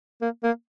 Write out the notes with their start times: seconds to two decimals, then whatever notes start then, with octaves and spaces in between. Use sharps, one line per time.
0.22 A#3
0.44 A#3